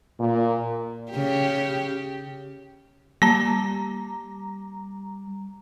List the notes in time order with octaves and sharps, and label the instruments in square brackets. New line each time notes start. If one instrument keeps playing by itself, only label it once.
[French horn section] A#2
[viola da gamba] C#3 G4
[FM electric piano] G3 A#5 [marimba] A#3 A5